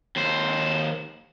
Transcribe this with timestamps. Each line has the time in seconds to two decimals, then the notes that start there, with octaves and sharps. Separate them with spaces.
0.16 D#2 C5